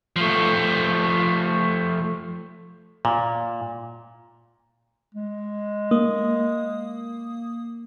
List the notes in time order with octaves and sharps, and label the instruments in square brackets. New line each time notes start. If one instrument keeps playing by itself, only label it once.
[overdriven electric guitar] F3 A3
[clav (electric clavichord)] A#2
[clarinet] G#3
[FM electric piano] A#3 D#6